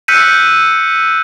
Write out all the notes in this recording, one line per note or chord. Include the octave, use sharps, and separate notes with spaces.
E6 F#6 G6 B6 C#7 D#7